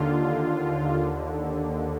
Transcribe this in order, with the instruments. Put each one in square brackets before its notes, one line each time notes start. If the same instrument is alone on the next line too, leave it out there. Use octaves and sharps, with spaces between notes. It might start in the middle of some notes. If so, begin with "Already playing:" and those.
Already playing: [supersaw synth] D#2 D3 F4